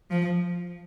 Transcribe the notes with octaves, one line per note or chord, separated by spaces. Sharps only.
F3